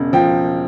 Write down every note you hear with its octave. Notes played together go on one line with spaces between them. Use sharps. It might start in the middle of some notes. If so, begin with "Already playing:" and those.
Already playing: E1 C#3
F3 G5